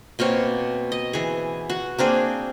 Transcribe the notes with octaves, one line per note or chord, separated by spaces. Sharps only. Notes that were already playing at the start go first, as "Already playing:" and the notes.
B2 A#3 C4 C#5
D#5
E3 G#4
F#4
A#3 C4 D4 G#4